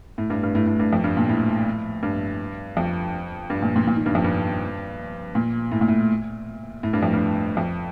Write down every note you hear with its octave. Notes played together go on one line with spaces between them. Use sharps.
A2
G2
G2
A2
A2
G2
F2
G2
A#2
A2
G2
F2
G2
A#2
A#2
A#2
D#3
G2
F2
G2
A#2
A2
A#2
A2
A2
G2
F2
G2
F2